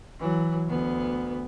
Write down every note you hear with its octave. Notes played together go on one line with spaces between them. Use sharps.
E3 F#3
D2 B3